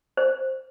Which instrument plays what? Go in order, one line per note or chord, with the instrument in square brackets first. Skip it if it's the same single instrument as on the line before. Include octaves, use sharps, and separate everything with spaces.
[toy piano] C5